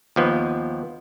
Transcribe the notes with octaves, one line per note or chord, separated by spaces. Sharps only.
D#2 F3 B3